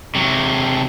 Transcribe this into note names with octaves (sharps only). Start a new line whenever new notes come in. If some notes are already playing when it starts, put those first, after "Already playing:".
C3 F#3